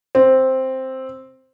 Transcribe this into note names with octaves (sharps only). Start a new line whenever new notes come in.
C4